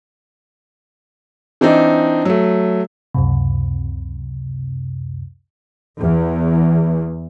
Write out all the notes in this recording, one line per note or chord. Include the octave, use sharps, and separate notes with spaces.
E3 C4 D4 D#4
F#3 A3
C#2 F#2 C3
E2